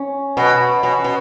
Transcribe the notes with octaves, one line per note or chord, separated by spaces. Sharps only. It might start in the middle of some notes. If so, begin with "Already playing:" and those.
Already playing: C#4
B2 F#4 B4
B2 C#4
B2